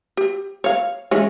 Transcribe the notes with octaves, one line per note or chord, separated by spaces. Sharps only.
G4
C#5 F5
E3 G#3 C#4